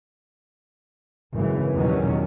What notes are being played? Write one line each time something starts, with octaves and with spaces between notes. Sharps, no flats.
G#1 F#2 C#3 E3
E2 B2 D#3 F#3 G3 C#4